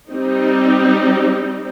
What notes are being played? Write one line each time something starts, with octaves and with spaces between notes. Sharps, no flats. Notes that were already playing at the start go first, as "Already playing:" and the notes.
G3 C4 D#4